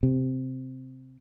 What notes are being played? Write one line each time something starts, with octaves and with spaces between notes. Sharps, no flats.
C3